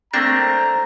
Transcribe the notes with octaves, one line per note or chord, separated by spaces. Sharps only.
A3 A#3 C4 D4 A#5